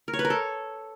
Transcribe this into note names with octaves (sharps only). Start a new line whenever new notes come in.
A#4
C#5
B4
A#4
A4